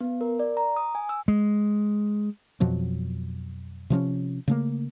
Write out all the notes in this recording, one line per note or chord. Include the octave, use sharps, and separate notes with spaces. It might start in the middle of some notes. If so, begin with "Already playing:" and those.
B3
A#4
D5
A#5
D#6
G#5
E6
G#3
F2 B2 F3 F#3
C3 F3 C4 C#4
C#3 A3 A#3